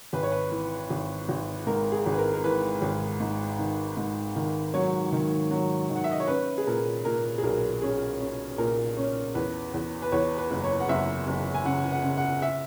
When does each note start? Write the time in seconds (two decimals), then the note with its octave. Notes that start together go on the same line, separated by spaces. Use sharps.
0.13 G#1 B4
0.23 C#5
0.32 B4
0.52 E3
0.90 G#1
1.29 G#1
1.67 G#2 A#4
1.92 G#4
2.06 G#1
2.12 B4
2.19 A#4
2.33 A#4
2.44 E3 B4
2.82 G#1
3.20 G#2
3.59 D#3
3.97 G#2
4.36 D#3
4.74 F#3 C#5
5.12 D#3
5.51 F#3
5.90 D#3
5.95 F#5
6.04 E5
6.12 D#5
6.20 C#5
6.28 C#4 B4
6.58 G#4
6.67 A#2 A#4
7.05 A#2 A#4
7.38 G#4
7.43 B1 A#4
7.82 C#4 G#4
8.20 C#4
8.58 A#2 A#4
8.97 C#4
9.35 E2 B4
9.74 E2
10.02 B4
10.12 E2 C#5
10.38 B4
10.51 F#1
10.64 C#5
10.80 F#5
10.89 F#1 E5
11.27 F#1
11.54 G#5
11.65 C#3 F#5
11.92 F#5
12.04 C#3
12.17 F#5
12.42 E5